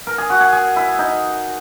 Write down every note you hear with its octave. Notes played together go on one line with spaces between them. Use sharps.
A#4
G#4
F#4
G#4
G#4
E4
D#4